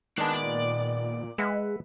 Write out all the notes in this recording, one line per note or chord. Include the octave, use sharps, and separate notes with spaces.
D#3 G#3 B3 D4 A5
A#2 D5
G#3 B4 E5 F#5